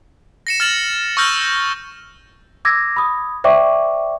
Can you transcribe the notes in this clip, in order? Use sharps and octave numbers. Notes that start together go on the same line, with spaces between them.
A#6 C#7 E7
F6 A6 E7 F#7
C#6 E6 F6 G6 A#6
D6 E6 G#6 A#6
B5 D#6
C5 D5 E5 G5 C#6 D6